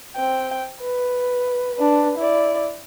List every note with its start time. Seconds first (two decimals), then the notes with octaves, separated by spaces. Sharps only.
0.16 C4 G5
0.81 B4
1.75 D4 B4
2.18 E4 D5